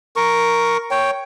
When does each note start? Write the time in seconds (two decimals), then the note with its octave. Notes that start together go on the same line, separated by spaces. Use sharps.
0.16 A#4 C#6
0.91 C#5 G5